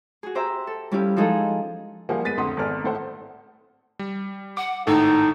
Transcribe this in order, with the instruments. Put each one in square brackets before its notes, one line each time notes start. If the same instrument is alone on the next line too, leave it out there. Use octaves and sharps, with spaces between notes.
[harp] F#4 G#4
G4 C5 E5 A#5
A4
G3 C#4 E4 F4 G4
F3 G#3 D#4 G#4 A4
[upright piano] F3 G3 A#3 E4 F#5 G#5
G#3 B3 A6 B6 D#7
A1 F2 D3 F#5 C6 D#6
G#1 B3 G#4 A4 D5 F6
A2 A4 C5 F#5
[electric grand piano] G3
[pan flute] F#5 [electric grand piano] D6
[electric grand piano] G#1 A2 A4 [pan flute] D#4